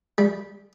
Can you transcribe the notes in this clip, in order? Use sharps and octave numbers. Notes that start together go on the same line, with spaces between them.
G3